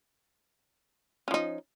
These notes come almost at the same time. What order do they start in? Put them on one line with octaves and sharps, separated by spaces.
C#4 F3 D#4